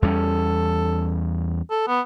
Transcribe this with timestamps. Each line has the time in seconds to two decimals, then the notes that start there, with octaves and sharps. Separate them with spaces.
0.02 E2 G3 C#4 A4
1.71 A4
1.88 B3